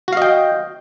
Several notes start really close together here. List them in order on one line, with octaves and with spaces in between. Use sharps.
F#4 F5 D#5 G5